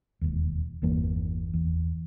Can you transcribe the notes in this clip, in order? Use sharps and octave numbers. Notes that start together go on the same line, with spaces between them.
E1 D#2
G1 E2 E3 A#3
E2